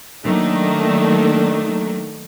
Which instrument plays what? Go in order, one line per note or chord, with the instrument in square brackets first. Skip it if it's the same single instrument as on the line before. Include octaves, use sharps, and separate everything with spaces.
[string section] D#3 F#3 A3 A#3 D4 D#4